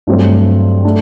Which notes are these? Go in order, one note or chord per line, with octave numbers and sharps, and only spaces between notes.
G2 F#3 A3 C4
A3 D4